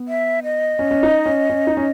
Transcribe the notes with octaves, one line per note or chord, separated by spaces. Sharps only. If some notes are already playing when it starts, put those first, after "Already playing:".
Already playing: B3
E5
D#5
C#4
C#4
D#4
C#4
C#4
D#4
C#4